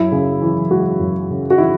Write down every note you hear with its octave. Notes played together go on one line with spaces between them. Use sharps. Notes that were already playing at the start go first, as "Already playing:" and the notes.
Already playing: F#2 E4
C#3
E3
G#3 F#4
F#2
C#3
F#4
E3 E4